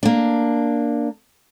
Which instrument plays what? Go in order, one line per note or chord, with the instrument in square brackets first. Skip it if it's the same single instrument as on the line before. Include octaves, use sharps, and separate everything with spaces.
[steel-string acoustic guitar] A#3 D4